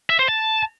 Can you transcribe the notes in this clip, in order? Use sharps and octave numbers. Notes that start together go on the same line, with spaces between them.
E5
C5
A5